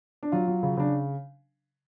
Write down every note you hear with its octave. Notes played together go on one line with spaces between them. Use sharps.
D4
F#3 F4
F#3
C#3
C#3 D4